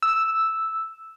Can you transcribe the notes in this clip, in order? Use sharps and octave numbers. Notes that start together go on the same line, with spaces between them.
E6